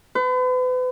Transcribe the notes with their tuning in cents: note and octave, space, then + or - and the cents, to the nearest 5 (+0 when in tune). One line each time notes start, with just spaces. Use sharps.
B4 +40